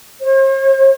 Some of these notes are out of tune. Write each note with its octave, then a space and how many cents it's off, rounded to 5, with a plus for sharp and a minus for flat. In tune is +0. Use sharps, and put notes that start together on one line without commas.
C5 +45